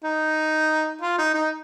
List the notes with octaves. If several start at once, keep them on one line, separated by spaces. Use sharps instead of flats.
D#4
F4
D#4
D#4